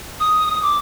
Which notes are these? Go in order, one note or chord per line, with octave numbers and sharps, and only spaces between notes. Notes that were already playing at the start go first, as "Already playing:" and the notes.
D#6
D#6
D6